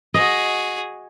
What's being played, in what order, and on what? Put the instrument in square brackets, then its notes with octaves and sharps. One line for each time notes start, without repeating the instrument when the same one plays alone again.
[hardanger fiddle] F#4 G#4 [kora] D#5